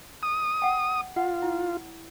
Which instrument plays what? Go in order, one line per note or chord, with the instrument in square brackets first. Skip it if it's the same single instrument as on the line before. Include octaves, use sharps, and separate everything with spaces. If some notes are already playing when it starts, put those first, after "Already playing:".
[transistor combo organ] D#6
[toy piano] F#5 G5
[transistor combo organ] F4 [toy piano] F#5
[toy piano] E4